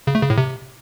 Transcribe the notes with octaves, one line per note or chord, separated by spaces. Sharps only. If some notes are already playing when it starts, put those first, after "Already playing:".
C#3
A3
C#3
A2
C3